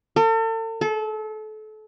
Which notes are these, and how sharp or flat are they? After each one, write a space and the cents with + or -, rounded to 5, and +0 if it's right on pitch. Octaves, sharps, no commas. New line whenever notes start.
A4 +40
A4 -30